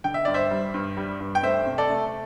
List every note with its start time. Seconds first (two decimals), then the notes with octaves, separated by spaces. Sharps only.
0.04 D3 G5
0.14 E5
0.25 G2 D5
0.34 C5 E5
0.51 G3
0.74 G2
0.97 G3
1.20 G2
1.35 G5
1.43 A3 C5 E5
1.67 C3
1.78 A4 D5
1.90 A3